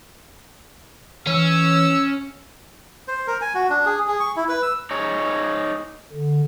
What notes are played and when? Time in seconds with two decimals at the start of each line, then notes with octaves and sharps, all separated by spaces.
1.27 E3 C#4 E6
3.08 C5
3.27 A#4
3.41 G#5
3.55 F#4
3.70 D4
3.86 G#4
4.07 G#4
4.20 C#6
4.36 E4
4.49 B4
4.62 E6
4.91 D#4 G#4 C#5
6.13 D3